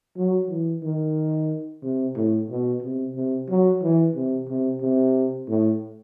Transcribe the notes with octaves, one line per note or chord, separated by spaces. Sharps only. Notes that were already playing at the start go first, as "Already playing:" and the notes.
F#3
E3
D#3
C3
A2
B2
C3
C3
F#3
E3
C3
C3
C3
A2